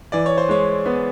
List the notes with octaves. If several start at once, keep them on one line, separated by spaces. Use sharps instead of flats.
E3 D5
C#5
C5
G#3 C#5
B3